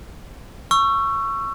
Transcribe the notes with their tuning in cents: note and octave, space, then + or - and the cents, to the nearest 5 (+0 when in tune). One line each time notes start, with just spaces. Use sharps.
C#6 +0 E6 +30